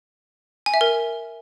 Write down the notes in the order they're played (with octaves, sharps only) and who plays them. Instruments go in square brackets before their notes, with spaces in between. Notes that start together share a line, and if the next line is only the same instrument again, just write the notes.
[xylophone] G#5
E5
A#4